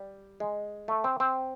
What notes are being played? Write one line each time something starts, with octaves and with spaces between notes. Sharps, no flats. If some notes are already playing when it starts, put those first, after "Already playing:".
Already playing: G3
G#3
A3
C4
C4